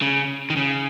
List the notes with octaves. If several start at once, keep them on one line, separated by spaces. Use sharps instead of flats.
C#3
D#3
C#3